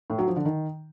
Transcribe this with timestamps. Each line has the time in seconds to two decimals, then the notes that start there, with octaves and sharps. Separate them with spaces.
0.10 A2
0.19 F#3
0.27 F3
0.36 D3
0.45 D#3